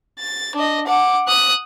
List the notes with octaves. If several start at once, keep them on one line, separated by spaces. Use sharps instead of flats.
A6
D4 D#5
F#5 D6
D#6 F#6